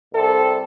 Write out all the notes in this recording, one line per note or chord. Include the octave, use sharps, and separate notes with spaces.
C2 C3 G3 C4 A4